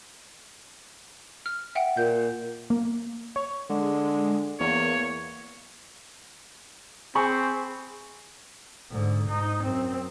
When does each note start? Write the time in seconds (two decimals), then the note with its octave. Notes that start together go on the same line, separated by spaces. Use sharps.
1.46 F6
1.75 E5 F#5 G5
1.97 A#2 G6
2.70 A#3
3.36 C#5
3.70 D3 G#3
4.60 E2 A#3 C#5
7.15 C4 G#4 B5 C#6
8.91 G#2 D3
9.28 G#2 D#4
9.63 F#2 C4